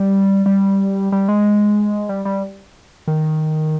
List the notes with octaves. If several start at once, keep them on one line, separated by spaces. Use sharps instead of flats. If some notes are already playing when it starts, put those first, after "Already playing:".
Already playing: G3
G3
G3
G#3
G3
G3
D#3